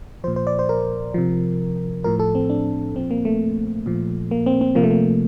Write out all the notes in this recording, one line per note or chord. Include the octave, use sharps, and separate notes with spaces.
A#2 F3 C5
C5
D5
C5
A#4
C3 F3
A2 F3 A#4
A4
C4
D4
A#2 F3 C4
A#3
A3
A#2 F3
A#3
C4
C4
C3 F3 A#3
A3
A#3